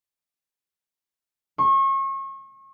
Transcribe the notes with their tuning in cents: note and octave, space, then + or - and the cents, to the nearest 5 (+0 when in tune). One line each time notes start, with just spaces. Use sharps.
C#6 -35